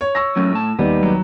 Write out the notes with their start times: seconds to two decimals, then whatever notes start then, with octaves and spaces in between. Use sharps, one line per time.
0.01 C#5
0.15 C#6 E6 A#6
0.36 A2 F#3 C#4
0.51 A2 A5
0.79 D#2 G3 B3 D#4
1.03 F#3